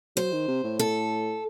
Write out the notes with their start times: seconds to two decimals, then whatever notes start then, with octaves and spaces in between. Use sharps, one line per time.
0.16 F#3 C5
0.32 D#3
0.48 C3
0.64 A2
0.79 A4